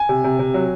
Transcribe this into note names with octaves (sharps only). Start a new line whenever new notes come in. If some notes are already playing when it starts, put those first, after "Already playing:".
Already playing: G#5
C3
C3
C3
F#3